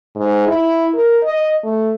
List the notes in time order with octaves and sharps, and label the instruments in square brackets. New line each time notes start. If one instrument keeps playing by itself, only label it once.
[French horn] G#2
E4
A#4
D#5
A3